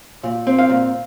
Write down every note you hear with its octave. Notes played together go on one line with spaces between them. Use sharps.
A#2
C4
F5
A#2